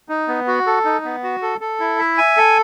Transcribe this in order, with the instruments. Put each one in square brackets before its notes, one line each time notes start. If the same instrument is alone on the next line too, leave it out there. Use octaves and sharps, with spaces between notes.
[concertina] D#4
B3
F#4
A4
D#4
B3
F#4
A4
A4
E4
E5
G#5
A4